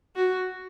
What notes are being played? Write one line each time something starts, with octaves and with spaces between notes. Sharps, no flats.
F#4